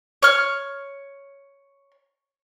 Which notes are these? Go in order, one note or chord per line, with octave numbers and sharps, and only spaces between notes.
C#5 F6